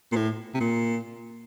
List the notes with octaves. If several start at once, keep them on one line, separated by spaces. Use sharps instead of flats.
A#2
A2
C3
A#2